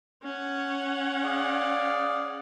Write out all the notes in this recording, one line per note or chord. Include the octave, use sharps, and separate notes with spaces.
C#4 F#5
G#4 D5 F5